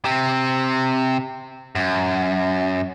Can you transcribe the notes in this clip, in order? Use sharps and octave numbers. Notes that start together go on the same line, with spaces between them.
C3 C4
F#2